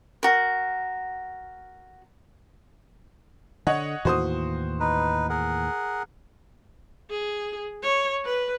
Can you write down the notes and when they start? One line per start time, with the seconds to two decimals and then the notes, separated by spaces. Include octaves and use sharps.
0.23 F#4 A#4
3.67 D3 C#5 D#5 F#5
4.05 D#2 A2 E3 F#4 C5 D#6
4.80 D#4 B4
5.29 G#4 A#4 F#5
7.10 G#4
7.83 C#5
8.25 B4